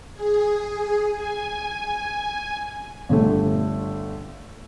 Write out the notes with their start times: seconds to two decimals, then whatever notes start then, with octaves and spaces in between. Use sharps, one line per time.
0.14 G#4
1.14 G#5
3.09 G1 D3 A3